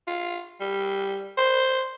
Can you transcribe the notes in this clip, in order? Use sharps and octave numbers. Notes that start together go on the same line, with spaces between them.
F4
G3
C5